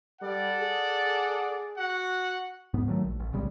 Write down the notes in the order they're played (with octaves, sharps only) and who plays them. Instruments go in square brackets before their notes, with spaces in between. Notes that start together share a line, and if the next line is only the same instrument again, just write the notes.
[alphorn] G3 [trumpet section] A4 D5 F#5
[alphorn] G#4
[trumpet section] F#4 F#5
[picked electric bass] G#2 B3
D#3 F#3 G#3 A3
A#1
A1
B1 C#3 G3 G#3